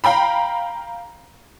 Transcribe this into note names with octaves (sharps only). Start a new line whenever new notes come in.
F5 G5 A#5 B5